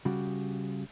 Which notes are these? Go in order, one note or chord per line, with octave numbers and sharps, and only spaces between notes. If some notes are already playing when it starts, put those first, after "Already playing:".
C#3 G3 F#4